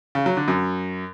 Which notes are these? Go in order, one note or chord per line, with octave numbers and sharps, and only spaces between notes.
C#3
F#3
D3
F#2